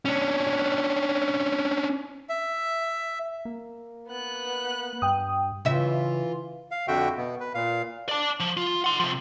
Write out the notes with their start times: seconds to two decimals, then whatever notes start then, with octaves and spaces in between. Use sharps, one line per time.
0.05 C#4 D4
2.29 E5
3.45 A#3
4.08 B3 F#6
5.02 G2 G5 D#6
5.65 C#3 E3 F4 E5
6.71 F5
6.88 F2 D3 F#4 E5 G5
7.17 B2 B3
7.40 B4
7.55 A#2 F5
8.09 D5 A5
8.40 F3
8.57 F4
8.84 F#5 C6
8.99 C3 F3